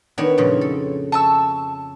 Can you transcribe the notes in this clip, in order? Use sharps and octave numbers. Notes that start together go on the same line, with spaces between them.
D#3 B3 D4 C#5
F2 A#2 C#3
A4
A5 C#6 E6